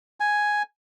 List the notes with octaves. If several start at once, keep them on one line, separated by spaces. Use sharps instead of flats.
G#5